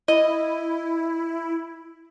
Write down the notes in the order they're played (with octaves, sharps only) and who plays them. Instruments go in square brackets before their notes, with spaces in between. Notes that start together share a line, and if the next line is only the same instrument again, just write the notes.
[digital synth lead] E4 [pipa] D#5